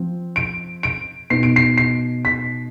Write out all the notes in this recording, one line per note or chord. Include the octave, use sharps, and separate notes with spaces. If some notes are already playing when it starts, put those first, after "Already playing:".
Already playing: F3 C4
D7
D7
B2 B3 D#4 C7
D7
C7
C7
B6